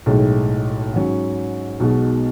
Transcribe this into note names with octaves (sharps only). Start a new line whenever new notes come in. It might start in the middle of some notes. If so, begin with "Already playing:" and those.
B1 A2 G#3 D#4
G#2 F#3 C#4
B1 B2 G#3 D#4 F#4